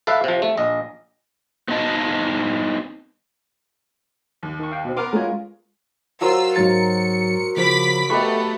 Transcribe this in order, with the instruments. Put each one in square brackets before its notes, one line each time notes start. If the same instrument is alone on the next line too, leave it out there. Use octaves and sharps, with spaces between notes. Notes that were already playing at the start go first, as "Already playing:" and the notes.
[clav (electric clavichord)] A4 B4 E5 F5
C3 F3
A3
A#1 D#5
[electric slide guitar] B3 C4 D#4 D#5 A5
[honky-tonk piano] D#2
[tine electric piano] D#3 C#6
F5 G5
B2 C4
[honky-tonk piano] B3 A#4 [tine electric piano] C6 D6 F6
[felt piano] G#3 F4 [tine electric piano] C#4 C#5
[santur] F#3 A#4 C5 [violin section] F4 E6
[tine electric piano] G#2 F#3 A6 [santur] A#4 [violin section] C#7
[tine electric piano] C#3 F3 [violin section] B5 D6 B6
[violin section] A3 B3 [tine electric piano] G4 B5 C#6 [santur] B4 D#5